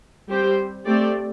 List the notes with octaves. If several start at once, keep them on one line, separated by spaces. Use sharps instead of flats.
G3 C4 G4 C5
A3 C4 G4 D5